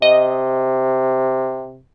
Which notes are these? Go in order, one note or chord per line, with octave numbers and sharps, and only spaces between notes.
C3 D#5